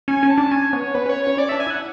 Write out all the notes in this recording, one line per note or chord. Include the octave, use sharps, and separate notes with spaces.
C#4 G#5
C#4
A5
D4
C#4 G#5
B3 C#5
B3 B4
C#4
C#5
C#4 C#5
C#4 D5
D4 E5
G#5
E4
F#5